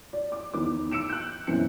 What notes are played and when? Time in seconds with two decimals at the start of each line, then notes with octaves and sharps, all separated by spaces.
0.13 D5
0.32 D6
0.54 E2 D#3 B3 D6
0.91 E6 C#7 D7 E7
1.09 F#6 G6
1.47 F#2 B2 E3 C4 C#7